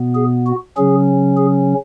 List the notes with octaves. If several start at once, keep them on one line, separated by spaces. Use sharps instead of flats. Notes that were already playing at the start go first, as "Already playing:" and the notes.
Already playing: B2 B3
G#4
F#4
C#3 F#3 C#4 G#4
G#4